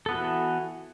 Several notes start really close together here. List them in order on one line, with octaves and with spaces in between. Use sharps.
A4 B3 F#4 E3